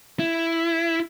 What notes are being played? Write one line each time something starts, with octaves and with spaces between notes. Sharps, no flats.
E4